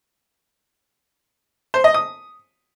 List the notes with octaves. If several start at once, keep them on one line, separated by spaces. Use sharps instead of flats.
C5
D#5
D#6